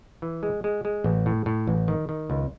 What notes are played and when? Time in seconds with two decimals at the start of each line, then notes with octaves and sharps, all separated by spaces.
0.22 E3
0.43 G#3
0.64 G#3
0.85 G#3
1.04 A1
1.26 A2
1.46 A2
1.67 A1
1.88 D#3
2.09 D#3
2.30 C#2